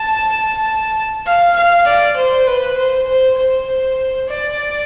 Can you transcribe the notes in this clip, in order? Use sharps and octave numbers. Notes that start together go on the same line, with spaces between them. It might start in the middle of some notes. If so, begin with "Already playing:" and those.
Already playing: A5
F5
F5
D5
C5
B4
C5
C5
C5
D5